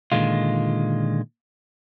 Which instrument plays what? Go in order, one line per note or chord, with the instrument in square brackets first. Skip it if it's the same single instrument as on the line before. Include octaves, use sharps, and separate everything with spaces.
[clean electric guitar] A#2 D3 D#3 G#3 F4